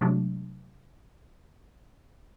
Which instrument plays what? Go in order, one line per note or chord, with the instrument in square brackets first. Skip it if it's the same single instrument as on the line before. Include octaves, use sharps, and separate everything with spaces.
[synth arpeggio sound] C3 F#3 G#3 A3 D4